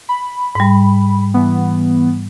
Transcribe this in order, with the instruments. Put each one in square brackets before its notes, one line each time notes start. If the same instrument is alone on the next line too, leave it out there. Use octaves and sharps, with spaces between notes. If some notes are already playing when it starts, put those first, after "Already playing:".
[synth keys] B5
[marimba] G#2 G3
[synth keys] E3 B3